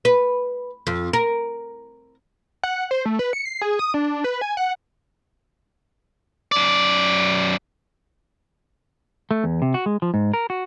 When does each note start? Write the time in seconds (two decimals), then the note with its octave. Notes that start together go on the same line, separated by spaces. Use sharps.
0.05 B4
0.87 F2
1.13 A#4
2.63 F#5
2.91 C5
3.05 A3
3.19 B4
3.33 C#7
3.45 C7
3.62 G#4
3.79 D#6
3.94 D4
4.24 B4
4.41 G#5
4.57 F#5
6.52 F#2 D5
9.31 A3
9.44 E2
9.62 C3
9.74 F#4
9.86 G#3
10.02 F3
10.14 G#2
10.34 A#4
10.50 F#4